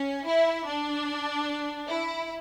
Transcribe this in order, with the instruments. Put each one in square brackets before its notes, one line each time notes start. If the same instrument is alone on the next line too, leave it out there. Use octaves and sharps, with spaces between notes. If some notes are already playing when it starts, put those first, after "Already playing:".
Already playing: [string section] C#4
E4
D4
E4